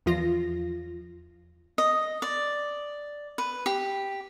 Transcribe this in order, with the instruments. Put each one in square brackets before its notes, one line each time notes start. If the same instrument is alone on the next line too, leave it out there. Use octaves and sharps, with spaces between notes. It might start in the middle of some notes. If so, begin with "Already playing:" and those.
[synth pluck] E2 F3 F4 A#6
[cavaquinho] D#5
D5
B4
G4